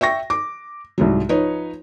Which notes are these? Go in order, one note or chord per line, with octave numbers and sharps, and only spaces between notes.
E5 G5 C#6 A#6
D6
C2 G#2 F#3
F3 D#4 B4 C#5